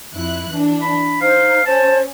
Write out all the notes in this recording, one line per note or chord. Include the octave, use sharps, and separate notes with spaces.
F2 E4 F#6
E3 D4
B5
D#4 C5 F5
C#4 C5 A5